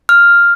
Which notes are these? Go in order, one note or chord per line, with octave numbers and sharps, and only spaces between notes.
F6